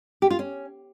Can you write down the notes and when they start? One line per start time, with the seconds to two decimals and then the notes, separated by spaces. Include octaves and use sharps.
0.22 G4
0.30 F4
0.39 C#4